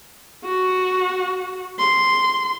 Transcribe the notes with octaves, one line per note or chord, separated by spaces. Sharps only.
F#4
C6